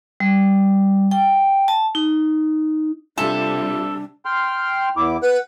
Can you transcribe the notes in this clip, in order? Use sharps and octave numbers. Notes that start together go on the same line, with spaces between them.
G3
G5
A5
D#4
C3 G3 D4 F4 A4 E5
G5 C6 F6
E2 E4 D6
B4 F#5